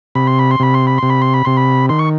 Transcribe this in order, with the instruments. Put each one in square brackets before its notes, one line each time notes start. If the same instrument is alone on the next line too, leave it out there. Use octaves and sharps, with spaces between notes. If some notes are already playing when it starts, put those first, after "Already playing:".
[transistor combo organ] C3 B5
C6
B5
C6
C3 B5
C6
B5
C3 C6
B5
C6
B5
C3 C6
B5
D#3 C6
C#6